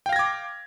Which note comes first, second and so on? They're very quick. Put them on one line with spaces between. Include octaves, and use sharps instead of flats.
G5 F5 A#6 G#6 D6